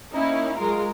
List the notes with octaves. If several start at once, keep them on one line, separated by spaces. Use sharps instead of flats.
A#3 C#4 D#4 E4
F#3 G#3 F4 A#4